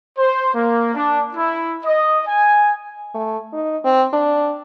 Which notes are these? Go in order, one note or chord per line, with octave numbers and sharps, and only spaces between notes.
C5
A#3
D4
E4
D#5
G#5
A3
D#4
C4
D4